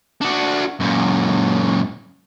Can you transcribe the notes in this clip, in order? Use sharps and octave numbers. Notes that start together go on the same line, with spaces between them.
D4 F#4
F#2 A#2